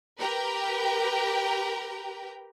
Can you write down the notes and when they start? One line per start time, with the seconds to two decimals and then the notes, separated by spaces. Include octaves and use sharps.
0.19 G4 A#4 B4 G5 A#5